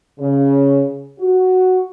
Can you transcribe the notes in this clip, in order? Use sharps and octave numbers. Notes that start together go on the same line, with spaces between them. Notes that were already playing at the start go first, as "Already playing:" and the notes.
C#3
F#4